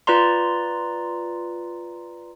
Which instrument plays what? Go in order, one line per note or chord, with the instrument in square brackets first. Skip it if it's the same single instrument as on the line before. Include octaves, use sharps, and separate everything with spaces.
[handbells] F4 B4 D5 A#5 C6